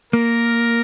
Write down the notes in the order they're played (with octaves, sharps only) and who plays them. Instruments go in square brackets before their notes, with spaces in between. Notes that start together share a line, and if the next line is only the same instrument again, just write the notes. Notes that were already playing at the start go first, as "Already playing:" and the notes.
[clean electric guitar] A#3 [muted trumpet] A#4